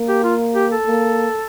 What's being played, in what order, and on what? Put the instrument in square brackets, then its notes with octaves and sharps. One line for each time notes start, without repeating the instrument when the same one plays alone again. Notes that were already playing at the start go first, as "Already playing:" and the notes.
Already playing: [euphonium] A#3
[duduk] G4
F4
G4
A4
[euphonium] A#3